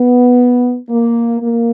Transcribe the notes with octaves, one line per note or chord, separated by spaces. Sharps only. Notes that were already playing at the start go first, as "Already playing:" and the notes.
Already playing: B3
A#3
A#3